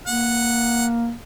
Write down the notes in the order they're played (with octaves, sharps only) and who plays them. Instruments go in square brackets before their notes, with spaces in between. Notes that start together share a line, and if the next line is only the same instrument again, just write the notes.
[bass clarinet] A#3 [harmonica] F#5